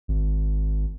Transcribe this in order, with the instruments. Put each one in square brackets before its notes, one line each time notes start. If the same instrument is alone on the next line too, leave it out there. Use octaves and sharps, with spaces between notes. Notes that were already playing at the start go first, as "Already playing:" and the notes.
[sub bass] G#1